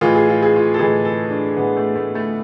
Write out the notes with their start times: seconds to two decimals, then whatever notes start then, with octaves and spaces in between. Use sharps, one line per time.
0.01 A2 E3 G#3 F4
0.15 G#4
0.29 F4
0.42 G#4
0.56 F4
0.74 A4
0.79 A2 E3 G#3 G#4
1.05 A4
1.31 D4
1.57 A2 E3 G#3 B3
1.77 A3
1.95 A3
2.15 A3